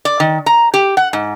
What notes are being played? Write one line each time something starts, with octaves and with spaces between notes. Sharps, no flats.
D5
D#3
A#5
G4
F#5
G#2